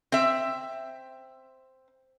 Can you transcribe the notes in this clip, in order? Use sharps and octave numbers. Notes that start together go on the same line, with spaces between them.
C4 E5